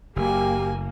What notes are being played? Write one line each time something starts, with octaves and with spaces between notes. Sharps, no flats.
F#1 A#3 G4 G#5